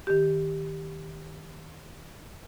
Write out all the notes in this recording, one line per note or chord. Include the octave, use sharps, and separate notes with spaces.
D#3 G4